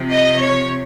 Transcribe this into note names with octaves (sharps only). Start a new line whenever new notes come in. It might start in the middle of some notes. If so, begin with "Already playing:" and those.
Already playing: C3 F3
D#5
C#5